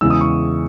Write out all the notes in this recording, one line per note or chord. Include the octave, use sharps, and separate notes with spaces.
E2 C#3 E3 G#3 E6
D#6
C#6